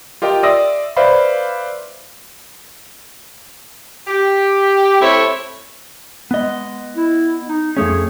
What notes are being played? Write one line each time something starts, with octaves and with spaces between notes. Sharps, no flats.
F4 G4 A#4 D#5 G5
D5 E5 C6 D#6 E6 A#6
B4 C5 D5 E5 F5 B5
G4
A3 C4 E4 A4 C#5
G#3 B3 D#5
E4
D#4
F2 A3 C#4 G#4